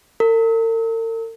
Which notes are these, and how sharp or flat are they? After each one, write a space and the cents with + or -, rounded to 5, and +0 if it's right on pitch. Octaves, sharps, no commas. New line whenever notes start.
A#4 -45